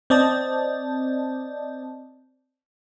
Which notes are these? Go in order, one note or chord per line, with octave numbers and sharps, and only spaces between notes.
C4 D5 D#5 A5